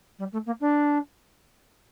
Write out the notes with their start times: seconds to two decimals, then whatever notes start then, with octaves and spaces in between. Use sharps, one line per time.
0.19 G3
0.32 A3
0.46 A#3
0.60 D4